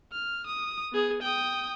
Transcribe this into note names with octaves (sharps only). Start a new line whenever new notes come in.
F6
D#6
B3 G#4
G5 D#6